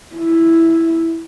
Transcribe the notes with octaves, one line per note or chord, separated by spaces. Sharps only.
E4